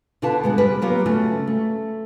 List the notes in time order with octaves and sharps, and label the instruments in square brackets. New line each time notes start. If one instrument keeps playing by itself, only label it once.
[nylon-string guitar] B2 D3 B3 F4 B4 A5
D3 G#3 B3
C3 G3 A#4 B4
F#3 A#3 B3 F4 G4 A#4
C#3 A3 C#4 F4 F#4
A3